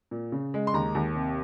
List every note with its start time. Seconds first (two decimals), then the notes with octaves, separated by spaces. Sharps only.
0.11 A#2
0.32 C#3
0.54 G#3
0.67 C6
0.74 D#2 A#5
0.95 D#2
1.15 C3